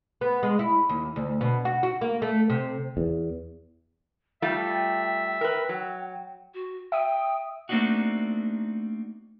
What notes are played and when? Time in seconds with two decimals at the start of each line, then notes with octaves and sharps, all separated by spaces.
0.21 B3
0.43 G#3
0.59 E4
0.89 D#2
1.16 D2
1.41 B2
1.65 F#4
1.83 F#4
2.01 A#3
2.22 A3
2.50 C3
2.97 E2
4.42 G3 A3 F4 E5 G5
5.41 A#4 B4
5.69 F#3
6.54 F#4
6.92 E5 G5 D#6
7.69 A3 A#3 C4 D4 D#4 F#4